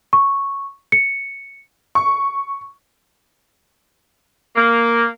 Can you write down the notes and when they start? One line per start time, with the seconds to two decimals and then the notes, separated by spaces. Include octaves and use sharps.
0.13 C#6
0.92 C#7
1.95 C#6
4.56 A#3